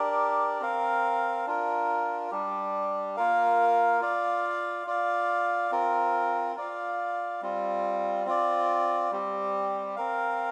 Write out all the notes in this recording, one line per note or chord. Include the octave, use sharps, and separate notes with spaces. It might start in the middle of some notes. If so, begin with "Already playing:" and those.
Already playing: D4 G4 A#4 D5
C4 A#4 F5
D4 F4 A#4
G3 D4 G4
A#3 F4 A#4 F5
F4 D5 F5
F4 D5 F5
C4 F4 A#4
F4 D5 F5
G3 C4 F4
C4 F4 D5
G3 C4 G4
C4 A#4 F5